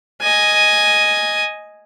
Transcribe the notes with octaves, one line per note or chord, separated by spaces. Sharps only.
D#5 G#5